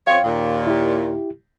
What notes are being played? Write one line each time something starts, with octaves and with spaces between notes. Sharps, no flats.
F2 F3 C#4 C#5 F5 G5
D#2 A#2
E4 G4